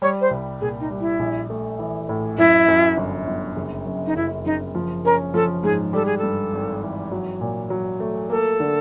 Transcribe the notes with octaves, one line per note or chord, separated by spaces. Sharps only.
G3 C#5
C5
C2
A#2 G#4
D#4
G3
E4
A#1
A3
E3
A2
F#2 E4
F#2
G1
G1
F#1
F#2
D#4
F#1 E4
F#1 D#4
F3
C#4 A#4
F3 A4
G#2 G#4
G3 A4
G#4
A4
G2
G#1
E3
F#3
A#2
F#3
A3
A#3 A4
D3